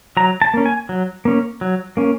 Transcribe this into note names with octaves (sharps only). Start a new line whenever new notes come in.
F#3 A#5
A5
A#3 C#4
G#5
F#3
A#3 C#4
F#3
A#3 C#4